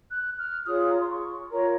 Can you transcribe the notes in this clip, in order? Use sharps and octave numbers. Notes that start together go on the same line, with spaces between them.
F#6
F6
F4 G#4 C#5 D#6
A#5
C6
C#6
F4 A#4 C#5 A#5